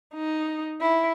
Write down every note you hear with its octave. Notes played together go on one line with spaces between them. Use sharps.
D#4
E4